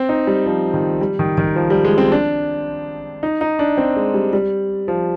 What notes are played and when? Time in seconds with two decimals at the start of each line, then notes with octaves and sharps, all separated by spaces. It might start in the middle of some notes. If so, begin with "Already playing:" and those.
Already playing: C4
0.09 D#4
0.27 G3
0.46 F3
0.74 D#3
1.01 G3
1.19 D#3
1.38 D#3
1.56 F3
1.70 G3
1.84 G#3
1.98 C4
2.12 D4
3.23 D#4
3.41 D#4
3.59 D4
3.77 C4
3.96 G#3
4.14 G3
4.33 G3
4.88 F3